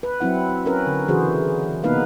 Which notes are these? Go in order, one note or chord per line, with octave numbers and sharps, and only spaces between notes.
B4
F#3 C4 E4 F#5
C#4 A#4 B4
D3
C#3 E3 F#4 G#4 C5
C3 A#3 B3 D#4 B4 F5